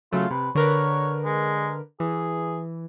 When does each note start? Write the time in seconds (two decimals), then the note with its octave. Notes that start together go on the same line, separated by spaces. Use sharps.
0.12 C#3 F#3 A3 F4
0.31 C3 B4
0.55 D3 A#4 B4 C#5
1.25 G#3
2.00 E3 G#4